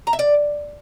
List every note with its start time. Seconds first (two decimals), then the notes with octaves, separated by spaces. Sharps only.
0.07 A#5
0.13 E5
0.19 D5